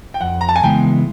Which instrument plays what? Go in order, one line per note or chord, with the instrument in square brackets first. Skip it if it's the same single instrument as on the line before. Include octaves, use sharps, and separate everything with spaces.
[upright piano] G5
[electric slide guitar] F2 [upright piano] F#5
[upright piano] A#5
A5
G#5
[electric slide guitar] C#3 E3 G#3 B3 [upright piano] G5